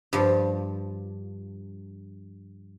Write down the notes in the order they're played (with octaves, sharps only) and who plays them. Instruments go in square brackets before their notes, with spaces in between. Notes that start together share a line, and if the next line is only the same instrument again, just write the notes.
[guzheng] G2 F3